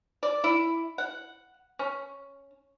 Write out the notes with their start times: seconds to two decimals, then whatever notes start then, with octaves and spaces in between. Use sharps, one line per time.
0.23 D5
0.44 E4
0.98 F#5
1.79 C#4